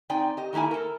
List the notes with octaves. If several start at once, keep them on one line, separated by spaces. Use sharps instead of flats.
C4 D#4 D5 G5 G#5
G4 D#5
D#3 A3 A#3 E4 G#5
A4 A#4